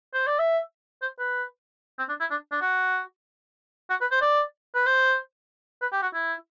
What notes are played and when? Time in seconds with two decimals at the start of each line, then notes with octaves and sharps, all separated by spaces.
0.14 C5
0.27 D5
0.39 E5
1.02 C5
1.19 B4
1.99 C4
2.09 D4
2.20 E4
2.31 D4
2.52 D4
2.62 F#4
3.90 F#4
4.01 B4
4.11 C5
4.21 D5
4.75 B4
4.86 C5
5.82 B4
5.93 G4
6.02 F#4
6.14 E4